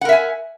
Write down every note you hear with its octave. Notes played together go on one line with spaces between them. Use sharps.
A#4 E5 F#5 G#5